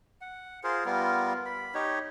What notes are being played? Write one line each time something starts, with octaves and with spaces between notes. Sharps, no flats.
F#5
F4 G#4 A#4 C5
G3 B3 F4 A#4
B5
D#4 G4 C#5